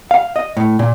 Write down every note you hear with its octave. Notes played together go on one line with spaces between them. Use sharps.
F5
D#5
A2
A#2